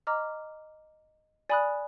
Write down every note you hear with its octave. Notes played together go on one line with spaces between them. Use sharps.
D#5 A#5 D6 F6
D5 G#5 B5 D#6 F#6